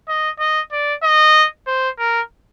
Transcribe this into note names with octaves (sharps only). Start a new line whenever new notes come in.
D#5
D#5
D5
D#5
C5
A#4